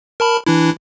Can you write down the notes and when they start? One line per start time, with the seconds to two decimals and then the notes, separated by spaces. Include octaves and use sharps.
0.20 A#4 A5 B5
0.47 E3 D4 E4